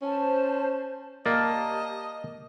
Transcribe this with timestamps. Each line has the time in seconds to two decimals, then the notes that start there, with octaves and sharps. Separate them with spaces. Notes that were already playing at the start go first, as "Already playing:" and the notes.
0.02 C#4 C5 A5
1.26 A#3 G4 D5 D#5 A5